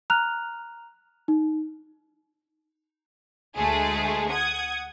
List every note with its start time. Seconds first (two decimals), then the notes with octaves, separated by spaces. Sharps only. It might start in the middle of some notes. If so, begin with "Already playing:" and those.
0.10 A#5 F6 F#6 F7
1.28 D#4
3.56 D2 G#3 A3 G#4
4.31 F#5 D#6 G#6